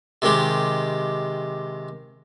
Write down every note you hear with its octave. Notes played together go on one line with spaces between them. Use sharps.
C3 D#3 G#3 G4